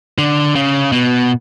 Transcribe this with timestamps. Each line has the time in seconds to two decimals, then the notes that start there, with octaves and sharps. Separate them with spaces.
0.18 D3
0.55 C#3
0.92 B2